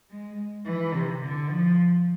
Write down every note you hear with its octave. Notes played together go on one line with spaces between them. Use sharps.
G#3
E3
C3
D3
F3